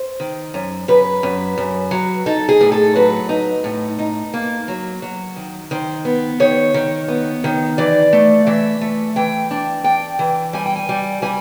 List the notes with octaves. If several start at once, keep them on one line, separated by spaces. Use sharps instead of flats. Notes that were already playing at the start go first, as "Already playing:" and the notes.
Already playing: C5
D#3
F#2
F#2 B4
F#2
F#2
F#3
D#4 A4
G#4
A2
A4
F#3 B4
D#4
A2
D#4
A#3
F#3
F#3
D#3
D#3 C5
B3
D#3 C#5
D#3
B3
D#3
E3 D5
A3
E3 E5
A3
E3 G5
D4
D4 G5
E3
G3 G#5
G5
G#5
G3
G3 G#5